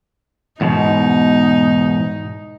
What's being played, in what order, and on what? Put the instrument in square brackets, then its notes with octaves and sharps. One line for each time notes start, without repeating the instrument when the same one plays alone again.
[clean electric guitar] E2 G#2 B2 [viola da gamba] D#4